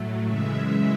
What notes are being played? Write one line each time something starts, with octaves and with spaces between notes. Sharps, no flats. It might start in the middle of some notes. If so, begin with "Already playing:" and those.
Already playing: A2 F#3 A3
F#2 C#3 E3 G#3 E5